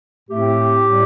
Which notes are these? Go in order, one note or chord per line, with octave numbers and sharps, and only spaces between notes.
A2 A3 C4 G4
A2 G3 C4